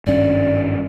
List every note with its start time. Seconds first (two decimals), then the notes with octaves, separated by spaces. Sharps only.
0.07 G#1 G2 C#4 D5